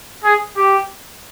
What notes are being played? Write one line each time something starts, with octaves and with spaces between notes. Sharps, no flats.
G#4
G4